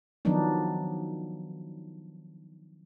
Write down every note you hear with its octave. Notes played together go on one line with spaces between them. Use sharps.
D#3 F3 F#3 B3 D4 D#4